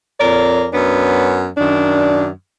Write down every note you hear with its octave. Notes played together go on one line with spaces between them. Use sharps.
F2 A#4 C#5 D5
F#2 B3 C#4 D4
F#2 D#3 D4